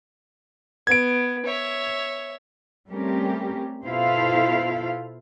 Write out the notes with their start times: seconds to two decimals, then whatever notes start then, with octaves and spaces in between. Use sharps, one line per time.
0.87 B3 G#6 D7
1.46 C#5 E5
2.90 G3 A3 C4 C#4 G4 A#4
3.85 B2 E4 F4 A4 C5 F5